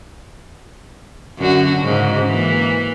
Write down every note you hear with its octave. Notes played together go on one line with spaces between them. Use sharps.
F#2 D3 F#4
G#2 C#3
E3 A#3